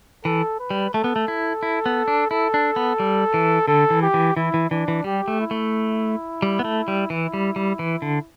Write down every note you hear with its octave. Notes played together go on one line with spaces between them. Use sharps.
E3 A4
B4
G3
A3 A4
B3
A3
E4
E4
B3
D4
E4 A4
D4
B3
G3
E3
D3 A4
E3
G4
E3
E3 E4
E3
E3 D4
E3
G3 G4
A3
E4
A3
G3
B3
A3
G3
E3 E4
G3
G3
E3
D3